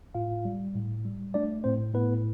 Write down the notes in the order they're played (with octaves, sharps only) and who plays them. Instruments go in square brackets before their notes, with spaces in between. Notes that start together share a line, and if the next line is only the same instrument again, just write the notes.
[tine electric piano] A2 F4 F5
G3
A2
G3
A3 D4 D5
A2 C4 C5
A2 B3 B4